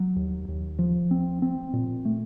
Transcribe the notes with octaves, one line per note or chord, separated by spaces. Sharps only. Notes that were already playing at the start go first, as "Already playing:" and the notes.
Already playing: F#3
D#2
D#2
F3
C4
C4
A#2
A3